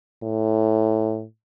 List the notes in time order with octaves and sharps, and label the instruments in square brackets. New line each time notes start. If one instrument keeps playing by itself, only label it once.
[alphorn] A2